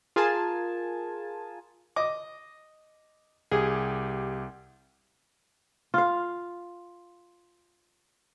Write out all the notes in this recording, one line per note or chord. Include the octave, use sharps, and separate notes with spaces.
F4 G#4 A#4 G#5 A5
D#5 D6
C2 G4 G#4
F4 F5